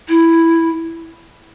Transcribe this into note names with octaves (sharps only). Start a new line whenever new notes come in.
E4